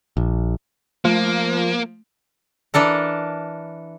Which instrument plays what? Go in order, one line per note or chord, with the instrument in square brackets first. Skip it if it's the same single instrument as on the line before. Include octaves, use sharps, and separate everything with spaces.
[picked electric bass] A#1
[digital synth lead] F3 [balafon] A3 [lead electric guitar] A#3
[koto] E3 D4 A4 A#4